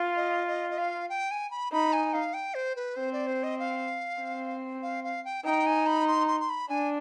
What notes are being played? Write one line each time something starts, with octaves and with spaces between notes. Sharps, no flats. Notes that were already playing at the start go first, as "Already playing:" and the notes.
Already playing: F4
D#5
D#5
D#5
F5
G5
G#5
B5
D#4 B5
G#5
F5
G5
C5
B4
C4 C5
D5
C5
D#5
F5
C4
F5
F5
G5
D#4 G5
G#5
B5
C6
C6
C6
B5
D4 G#5